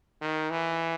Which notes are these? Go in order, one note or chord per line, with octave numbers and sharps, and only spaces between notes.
D#3
E3